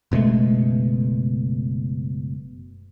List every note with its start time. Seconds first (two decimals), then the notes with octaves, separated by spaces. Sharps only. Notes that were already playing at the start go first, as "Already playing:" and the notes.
0.12 F#1 B2 G#3 A3